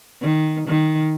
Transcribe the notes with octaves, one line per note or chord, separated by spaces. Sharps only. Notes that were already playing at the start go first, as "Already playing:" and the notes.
D#3
D#3